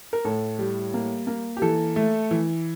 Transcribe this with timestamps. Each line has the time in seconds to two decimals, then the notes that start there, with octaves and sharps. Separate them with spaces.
0.13 A#4
0.25 A2 A4
0.59 G3
0.94 A#3
1.27 A#3
1.57 G4
1.62 E3 A4
1.96 A3
2.31 E3